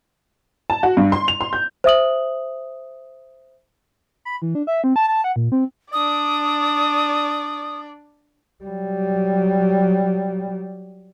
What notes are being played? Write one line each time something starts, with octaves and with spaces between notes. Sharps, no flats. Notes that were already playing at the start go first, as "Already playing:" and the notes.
A5
F#4
G2
C6
F7
C6
G6
C5 E5 D#6 F#7
B5
E3
D4
E5
C4
A5
A5
F#5
A#2
C4
D4 D5 D#6
F#3 G3